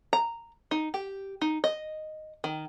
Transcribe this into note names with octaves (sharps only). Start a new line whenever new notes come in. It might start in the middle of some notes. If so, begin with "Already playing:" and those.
A#5
D#4
G4
D#4
D#5
D#3